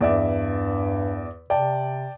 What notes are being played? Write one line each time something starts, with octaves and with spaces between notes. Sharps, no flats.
E2 G2 D5 E5
C3 D5 G5 A5